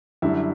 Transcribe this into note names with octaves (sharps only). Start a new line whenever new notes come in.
F#2 D3 G3 E4